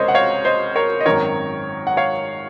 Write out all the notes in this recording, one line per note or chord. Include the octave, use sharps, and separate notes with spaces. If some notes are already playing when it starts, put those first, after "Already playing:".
Already playing: C#2 C3 A#4 C5 C#5 D#5
F#5
C#5 F5
C5 D#5
A#4 C#5
D#5
G#1 F#2 D#3 A#4 C#5
F#5
C#5 F5